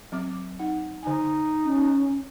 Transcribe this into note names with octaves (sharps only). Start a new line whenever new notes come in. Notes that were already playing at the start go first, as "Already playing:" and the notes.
F#3 C4 D6
D#4 F#5
D3 D#4 G#5
C#4